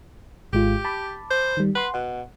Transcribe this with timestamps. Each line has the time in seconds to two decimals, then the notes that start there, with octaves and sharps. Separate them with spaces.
0.53 G#1 G#3 F4 G4
0.85 A5 B5 D6
1.30 C5
1.57 D#3 G3
1.75 B4 F#5 C6
1.94 B2 F#5